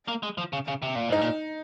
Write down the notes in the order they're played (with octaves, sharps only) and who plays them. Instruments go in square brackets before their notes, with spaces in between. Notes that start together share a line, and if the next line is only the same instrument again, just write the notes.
[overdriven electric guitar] A#3
G#3
F3
C#3
C#3
C3
A#2
[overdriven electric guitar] G#2 [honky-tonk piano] D#4
[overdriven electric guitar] A#2